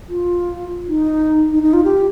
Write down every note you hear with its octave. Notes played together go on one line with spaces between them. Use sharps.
F4
D#4
D#4
D#4
F4
G4